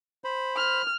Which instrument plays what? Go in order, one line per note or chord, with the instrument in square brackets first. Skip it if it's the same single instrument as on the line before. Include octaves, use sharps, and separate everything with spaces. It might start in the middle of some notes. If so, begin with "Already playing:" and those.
[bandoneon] C5 B5
[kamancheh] F6